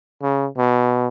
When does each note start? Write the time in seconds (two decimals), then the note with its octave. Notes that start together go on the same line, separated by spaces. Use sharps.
0.22 C#3
0.58 B2